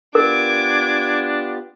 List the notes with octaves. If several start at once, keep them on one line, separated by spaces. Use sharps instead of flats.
B3 D4 F4 G4 A#4 D6 G#6